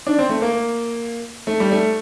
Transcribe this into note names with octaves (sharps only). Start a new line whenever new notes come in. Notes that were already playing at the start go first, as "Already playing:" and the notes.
D4
C4
A3
A#3
A3
G3
A3